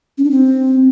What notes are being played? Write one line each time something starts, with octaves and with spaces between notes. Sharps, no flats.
C#4
D4
C4